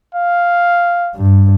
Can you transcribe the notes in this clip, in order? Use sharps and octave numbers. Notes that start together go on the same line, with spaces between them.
F5
G2